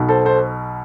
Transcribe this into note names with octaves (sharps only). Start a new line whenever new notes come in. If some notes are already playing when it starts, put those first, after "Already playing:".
Already playing: B1 B2
A4 C5
A4 C5